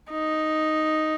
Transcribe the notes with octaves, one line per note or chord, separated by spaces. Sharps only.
D#4